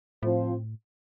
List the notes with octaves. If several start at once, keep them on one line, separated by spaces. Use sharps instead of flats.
A2 F3 C4 F4 C5